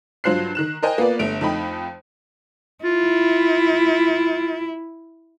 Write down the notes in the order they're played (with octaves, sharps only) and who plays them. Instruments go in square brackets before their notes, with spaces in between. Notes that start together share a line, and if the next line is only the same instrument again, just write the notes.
[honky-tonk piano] G2 F#3 F4 C5 F#6 C7
D#3 F#6 E7
A#4 C5 D#5 G5 G#5
A#3 B3 F4 B4 D5
G1 A3 D7 F7
F2 A3 D#4 G5 B5
[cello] E4 [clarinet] F4